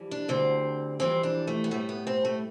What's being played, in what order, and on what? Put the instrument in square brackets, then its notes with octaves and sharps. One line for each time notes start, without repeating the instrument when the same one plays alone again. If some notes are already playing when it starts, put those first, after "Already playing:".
Already playing: [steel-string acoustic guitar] F2 E3 G3
D4
D2 D3 G3 C4
F2 E3 G3 C4
D4
A3
B3
A2 G3 A3
B3
C4
A3